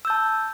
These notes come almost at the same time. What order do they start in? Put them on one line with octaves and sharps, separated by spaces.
E6 G6 A5